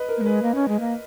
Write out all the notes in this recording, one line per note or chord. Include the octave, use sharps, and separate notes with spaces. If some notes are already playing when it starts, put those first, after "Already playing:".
Already playing: B4 D#5
A#4
A#3
G#3 B4
A#3
C#4
G#3
A#3